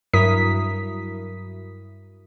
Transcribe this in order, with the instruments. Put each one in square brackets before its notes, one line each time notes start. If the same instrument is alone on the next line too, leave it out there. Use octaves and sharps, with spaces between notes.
[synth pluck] G2 F#3 E4 A#4 D#6 B6